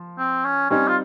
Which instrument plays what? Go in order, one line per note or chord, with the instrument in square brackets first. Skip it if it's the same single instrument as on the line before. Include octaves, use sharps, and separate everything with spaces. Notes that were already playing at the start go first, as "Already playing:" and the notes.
Already playing: [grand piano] F3
[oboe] C4
C#4
[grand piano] G3 C4 D#4 [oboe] C#4
[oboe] F4